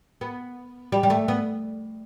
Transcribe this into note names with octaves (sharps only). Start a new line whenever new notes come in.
B3
G3
G3
A3
B3